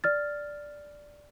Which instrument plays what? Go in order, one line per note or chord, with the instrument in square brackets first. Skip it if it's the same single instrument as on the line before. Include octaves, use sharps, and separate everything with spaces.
[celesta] D5 F6 A6